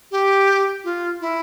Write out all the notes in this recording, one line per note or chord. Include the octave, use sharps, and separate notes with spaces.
G4
F4
E4